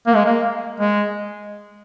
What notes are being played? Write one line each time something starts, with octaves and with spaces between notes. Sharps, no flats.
A#3
G#3
A#3
G#3